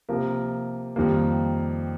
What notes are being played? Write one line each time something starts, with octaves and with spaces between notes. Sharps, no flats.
C3 F3 A#3 A#4
F2 D#3 G3 A#3